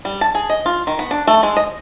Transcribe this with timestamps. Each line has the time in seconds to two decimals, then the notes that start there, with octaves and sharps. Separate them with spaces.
0.05 G3
0.21 A5
0.35 G#4
0.50 D#5
0.66 F4
0.87 D#3
0.99 B3
1.11 D4
1.27 A3
1.43 G#3
1.57 D#5